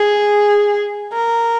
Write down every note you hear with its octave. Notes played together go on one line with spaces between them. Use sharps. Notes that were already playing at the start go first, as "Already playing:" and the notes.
Already playing: G#4
A#4